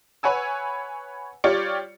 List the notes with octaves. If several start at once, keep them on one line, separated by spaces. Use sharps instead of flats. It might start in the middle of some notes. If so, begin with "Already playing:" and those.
B4 C#5 F#5 G#5 E6
G3 F4 G4 C#5 D5 C#7